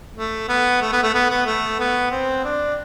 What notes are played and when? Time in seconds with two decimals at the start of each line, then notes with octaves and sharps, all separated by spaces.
0.17 A3
0.49 B3
0.82 A3
0.92 B3
1.03 A3
1.14 B3
1.30 B3
1.46 A3
1.79 B3
2.11 C4
2.44 D4